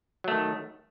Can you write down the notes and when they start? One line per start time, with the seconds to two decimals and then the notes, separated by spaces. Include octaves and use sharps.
0.24 F#3
0.28 A3
0.31 D#3